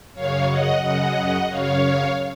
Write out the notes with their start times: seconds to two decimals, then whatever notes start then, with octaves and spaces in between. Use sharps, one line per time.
0.14 F#2 C#3 C#5 F5
0.49 D#5 F#5
0.82 F#2 C#3 D#5 F#5
1.49 F#2 C#3 C#5 F5